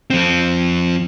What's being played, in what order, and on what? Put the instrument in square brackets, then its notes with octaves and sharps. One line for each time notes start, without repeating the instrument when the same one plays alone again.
[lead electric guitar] F2 C4